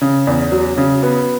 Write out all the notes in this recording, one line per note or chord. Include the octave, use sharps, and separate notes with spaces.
C#3
E2
F#3
C#3
B3